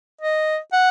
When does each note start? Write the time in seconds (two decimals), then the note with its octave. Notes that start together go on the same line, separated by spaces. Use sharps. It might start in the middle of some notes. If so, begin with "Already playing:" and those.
0.21 D#5
0.73 F#5